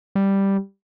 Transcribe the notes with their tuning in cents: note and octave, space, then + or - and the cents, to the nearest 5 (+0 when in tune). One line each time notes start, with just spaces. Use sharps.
G3 +0